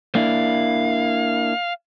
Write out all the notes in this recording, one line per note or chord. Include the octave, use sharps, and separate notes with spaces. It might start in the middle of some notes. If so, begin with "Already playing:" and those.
A#3 D4 E4 F5